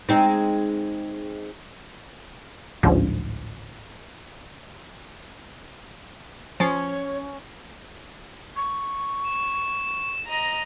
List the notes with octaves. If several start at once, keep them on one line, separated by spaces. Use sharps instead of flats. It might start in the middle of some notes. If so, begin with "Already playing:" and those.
G#3 C4 D#4
A1 D2 G#2 F3
F3 C#4 C#5
C#6
E7
D#5 A#5